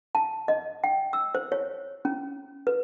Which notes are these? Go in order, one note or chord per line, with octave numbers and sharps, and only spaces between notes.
A5
D#5
G5
E6
C5
C#5
C#4
B4